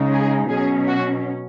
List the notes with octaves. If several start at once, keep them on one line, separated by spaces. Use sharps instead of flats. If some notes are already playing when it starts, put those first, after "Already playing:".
Already playing: C#3 G#3 D#4
G#4
B2 F#3 C#4 G#4
F#4